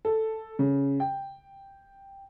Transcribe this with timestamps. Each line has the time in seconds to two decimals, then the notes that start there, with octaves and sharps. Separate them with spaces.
0.05 A4
0.59 C#3
1.00 G5